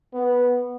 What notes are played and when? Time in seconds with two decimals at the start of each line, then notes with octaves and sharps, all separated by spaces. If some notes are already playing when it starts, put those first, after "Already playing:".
0.14 B3